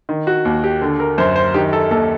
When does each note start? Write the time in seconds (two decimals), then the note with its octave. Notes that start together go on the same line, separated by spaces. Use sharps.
0.09 D#3
0.27 F#4
0.45 D#2
0.64 G4
0.81 D3
1.00 A#4
1.18 F#2 C5
1.36 C5
1.54 D#3 G4
1.73 A4
1.91 D#2 A4